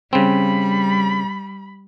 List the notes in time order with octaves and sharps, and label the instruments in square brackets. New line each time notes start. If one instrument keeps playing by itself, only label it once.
[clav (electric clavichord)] C#3 C4 [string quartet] G3 [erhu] B5